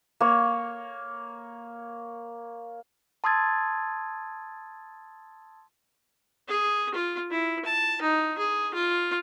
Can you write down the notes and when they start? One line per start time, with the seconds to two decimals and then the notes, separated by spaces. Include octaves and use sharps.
0.20 A#3 C#5
3.24 A5 C6 D#6 E6 G#6 A6
6.48 G#4
6.94 F4
7.31 E4
7.65 A5
8.01 D#4
8.38 G#4
8.74 F4